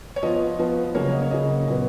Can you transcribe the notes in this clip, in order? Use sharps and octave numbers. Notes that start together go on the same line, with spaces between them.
C#5
F3 B3 F4 D#5
F3 B3 F4
C#3 F#3 A#3 C#5
D#5
C#5
C#3 F#3 A#3 D#5
A#2 F#3 B3